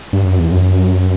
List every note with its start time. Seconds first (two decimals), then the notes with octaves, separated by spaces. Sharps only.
0.13 G2
0.25 F#2
0.39 E2
0.52 F#2